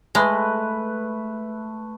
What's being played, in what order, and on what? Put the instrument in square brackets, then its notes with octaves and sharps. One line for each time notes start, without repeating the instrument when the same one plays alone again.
[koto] G#3 [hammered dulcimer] A3 B4